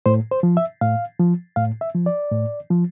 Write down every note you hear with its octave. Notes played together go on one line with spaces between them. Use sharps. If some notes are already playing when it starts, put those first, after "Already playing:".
A2 C5
C5
F3
E5
A2 F5
F3
A2 F5
E5
F3
D5
A2
F3